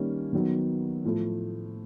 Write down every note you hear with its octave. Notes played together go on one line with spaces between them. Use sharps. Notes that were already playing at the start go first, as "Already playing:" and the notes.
Already playing: D#3 G3 A#3 C#4
D#3 F#3 B3
A2 F3 A3